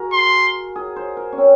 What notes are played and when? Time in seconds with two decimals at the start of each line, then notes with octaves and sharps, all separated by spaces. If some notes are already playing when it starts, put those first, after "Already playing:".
Already playing: F#4 G#4 A#4
0.13 C6
0.76 G#4
0.96 C5
1.17 A#4
1.33 C#4
1.38 C4